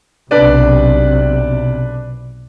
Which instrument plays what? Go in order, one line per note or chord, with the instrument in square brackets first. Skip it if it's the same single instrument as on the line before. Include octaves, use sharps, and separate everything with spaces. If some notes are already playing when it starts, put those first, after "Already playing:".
[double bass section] B1 C3 [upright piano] D4 B4 D5